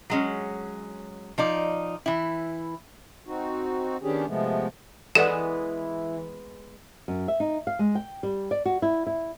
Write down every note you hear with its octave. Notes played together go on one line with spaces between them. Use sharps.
F#3 G#3 C#4
F3 D#4 D5
E3 E4
C4 D#4 F#4
D#3 B3 C#4 D4 G4 G#4
C3 F3 G#3 A3 B3
E3 G#3 B3 A4 D5 F#5 E7
F#2
E5
D#4
F5
G#3
G5
G3
D5
F#4
E4
E4